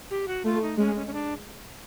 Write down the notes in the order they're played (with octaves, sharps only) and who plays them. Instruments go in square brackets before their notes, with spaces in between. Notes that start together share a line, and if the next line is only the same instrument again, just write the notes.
[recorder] G4
F#4
[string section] A3 [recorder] F4
[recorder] D#4
[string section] G#3 [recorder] C#4
[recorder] C#4
C#4
D4